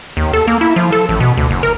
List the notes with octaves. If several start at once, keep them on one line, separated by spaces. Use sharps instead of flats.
D#2
A4
A#3
E4
F3
A4
A1
B2
D2
F#1
A#4